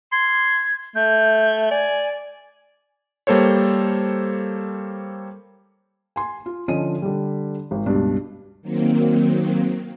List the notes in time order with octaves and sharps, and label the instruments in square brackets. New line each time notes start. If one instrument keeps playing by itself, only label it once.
[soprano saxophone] C6 [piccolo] G#6
[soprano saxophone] A3 [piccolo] G6
[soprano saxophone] D5 [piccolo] G#5
[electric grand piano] G3 A#3 A4 C5 C#5
[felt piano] G#5 C6
F4
D3 F3 C#4 D#5 D#7
D3 G3
G#1
C#2 G2 B2 D4
[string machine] D#3 F#3 A#3 C4